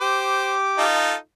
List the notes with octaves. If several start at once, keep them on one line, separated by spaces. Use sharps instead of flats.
G4 C5 D6
D#4 F4 A4